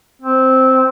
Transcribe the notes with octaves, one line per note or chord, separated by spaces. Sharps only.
C4